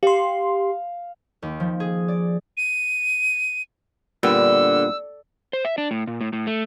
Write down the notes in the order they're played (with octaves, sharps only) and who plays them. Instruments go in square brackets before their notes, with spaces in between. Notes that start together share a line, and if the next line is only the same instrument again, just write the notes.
[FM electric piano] G4 C6 [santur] F5
[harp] D#2
F3
G#4
D5
[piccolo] D#7
[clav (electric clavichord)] A#2 G3 B3 [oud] D3 [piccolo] E6
[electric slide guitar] C5
E5
D4
A2
A#2
A2
A2
A3